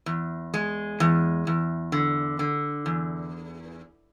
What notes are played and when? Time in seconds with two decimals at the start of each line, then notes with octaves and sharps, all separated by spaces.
0.06 E2
0.54 G#3
1.00 E2
1.47 E2
1.92 D3
2.39 D3
2.86 E2